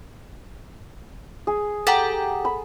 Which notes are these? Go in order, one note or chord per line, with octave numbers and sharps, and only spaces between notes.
G#4
G4 A4 F#5 A#5
B5